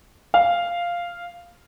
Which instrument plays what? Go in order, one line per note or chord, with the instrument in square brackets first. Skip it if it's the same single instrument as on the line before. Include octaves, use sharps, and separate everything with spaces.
[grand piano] F5